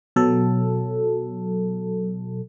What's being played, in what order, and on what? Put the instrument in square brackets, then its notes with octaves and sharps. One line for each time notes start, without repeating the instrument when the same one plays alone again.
[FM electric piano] B2 F#3 A4